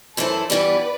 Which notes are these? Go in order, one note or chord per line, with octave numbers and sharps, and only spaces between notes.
F#2 E3 A3 E4 A4 C5
G2 E3 G3 B3 B4 D5